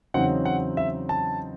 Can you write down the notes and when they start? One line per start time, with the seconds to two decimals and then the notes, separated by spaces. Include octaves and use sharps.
0.14 E2 C#3 F#3 C4 D#4 F#5
0.45 F#5
0.77 E5
1.09 A5